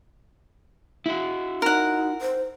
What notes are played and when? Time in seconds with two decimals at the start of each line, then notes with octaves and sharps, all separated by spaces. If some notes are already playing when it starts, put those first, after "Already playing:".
1.06 E4 F#4
1.62 D#4 A#4 F#5
2.21 C5